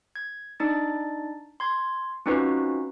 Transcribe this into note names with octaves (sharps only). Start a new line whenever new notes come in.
G#6
D4 D#4 A6
C6 G#6
C4 C#4 D#4 F4 F#4 B4